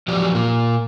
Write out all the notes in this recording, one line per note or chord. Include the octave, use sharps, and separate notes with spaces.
E2 F3 F#3 G4 D5
A#2 A#3